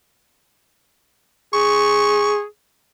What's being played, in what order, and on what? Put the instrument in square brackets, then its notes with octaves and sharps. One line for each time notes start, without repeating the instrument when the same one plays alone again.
[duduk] G#4 [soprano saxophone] C#6